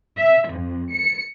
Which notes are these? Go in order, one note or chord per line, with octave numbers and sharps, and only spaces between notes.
E5
F2
C#7